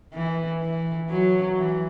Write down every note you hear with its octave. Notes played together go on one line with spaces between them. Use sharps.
E3
E3
F#3
E3